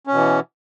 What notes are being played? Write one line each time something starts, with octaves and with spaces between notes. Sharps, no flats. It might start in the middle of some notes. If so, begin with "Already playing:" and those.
B2 E3 C#4